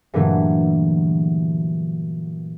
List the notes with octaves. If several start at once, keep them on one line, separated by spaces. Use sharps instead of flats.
G2 A#2 D3 E3 F#3 A3